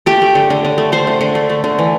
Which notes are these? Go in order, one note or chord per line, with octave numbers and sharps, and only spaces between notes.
A3 G4
A3
D3
D3
D3
A3
A3 C5
D3
D3
A3
A3
D3
E3